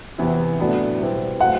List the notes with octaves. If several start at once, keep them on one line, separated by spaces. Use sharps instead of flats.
E2 C3 E3 B3 E4
A2 F#3 B3 D4 A4
B2 G3 C4 E4 B4
F#3 A3 C4 F#5